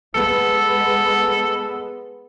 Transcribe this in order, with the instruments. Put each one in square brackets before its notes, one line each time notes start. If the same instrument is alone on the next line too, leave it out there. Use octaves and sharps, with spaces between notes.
[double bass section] G#3 B3 [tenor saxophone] A4